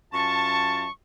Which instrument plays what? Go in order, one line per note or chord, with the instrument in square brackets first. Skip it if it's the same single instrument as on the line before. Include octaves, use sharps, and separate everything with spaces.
[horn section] F#2 F4 A5 [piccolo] C#6